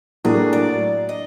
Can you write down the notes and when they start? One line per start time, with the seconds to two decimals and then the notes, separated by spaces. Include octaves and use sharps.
0.24 A2 F#3 A#3 D4 F#4 G#4
0.53 D5
1.09 D#5